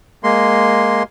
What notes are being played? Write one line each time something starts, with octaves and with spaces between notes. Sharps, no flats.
G#3 A#3 C6